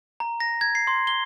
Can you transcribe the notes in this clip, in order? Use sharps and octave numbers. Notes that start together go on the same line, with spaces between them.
A#5
A#6
G#6
C7
C6
G7